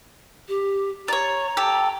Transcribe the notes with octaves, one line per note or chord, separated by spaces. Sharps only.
G4
C#5 D5 A#5
G4 A4